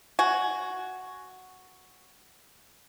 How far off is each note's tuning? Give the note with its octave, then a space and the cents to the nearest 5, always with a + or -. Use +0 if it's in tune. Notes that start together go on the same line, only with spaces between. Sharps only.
F#4 +0 G#5 +10